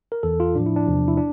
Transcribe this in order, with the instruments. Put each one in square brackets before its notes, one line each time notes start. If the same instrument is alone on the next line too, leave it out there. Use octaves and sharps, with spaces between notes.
[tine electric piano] A#4
E2 E3 A4
F4
A2 F3 D4
E4
D4
E2 C3 F3
E4
D4